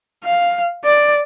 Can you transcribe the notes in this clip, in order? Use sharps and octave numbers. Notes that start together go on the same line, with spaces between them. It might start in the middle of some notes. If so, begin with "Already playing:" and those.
F5
D5